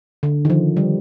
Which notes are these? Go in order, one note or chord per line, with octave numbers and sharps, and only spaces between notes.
D3
D#3
F3
G3